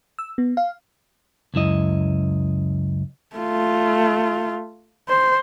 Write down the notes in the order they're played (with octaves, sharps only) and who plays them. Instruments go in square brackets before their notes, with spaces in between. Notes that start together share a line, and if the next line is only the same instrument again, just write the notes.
[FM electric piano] E6
B3
F5
[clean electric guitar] C#2 F#2 E4 D#5
[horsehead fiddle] A3 F4
C5